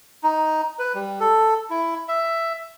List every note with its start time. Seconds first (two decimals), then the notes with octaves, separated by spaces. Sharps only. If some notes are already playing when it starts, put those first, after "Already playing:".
0.24 D#4
0.79 B4
0.95 G3
1.20 A4
1.70 E4
2.09 E5